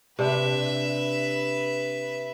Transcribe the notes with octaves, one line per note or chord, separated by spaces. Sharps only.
C3 D4 B4 E5